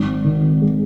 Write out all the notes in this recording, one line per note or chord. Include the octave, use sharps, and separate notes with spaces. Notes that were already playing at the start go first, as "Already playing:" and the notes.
Already playing: G#1
D#3
G#3